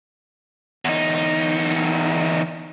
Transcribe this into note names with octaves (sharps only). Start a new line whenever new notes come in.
E2 D#4